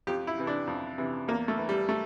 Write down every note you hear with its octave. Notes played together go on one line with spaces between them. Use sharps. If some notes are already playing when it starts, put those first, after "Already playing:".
F2 G4
E4
C3 E3
D4
F2
C3 E3
E2 A#3
A3
E3
G3
A3